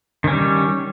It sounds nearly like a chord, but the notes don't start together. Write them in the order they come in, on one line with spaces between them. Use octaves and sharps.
D#3 C#4 G3